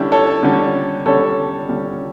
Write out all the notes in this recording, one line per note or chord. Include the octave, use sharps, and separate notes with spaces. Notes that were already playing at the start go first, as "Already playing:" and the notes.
Already playing: D3 G3 C#4 E4 G4
A4 C#5
D3 G3 C#4
D3 G3 C#4 A4 C#5
D3 G3 C#4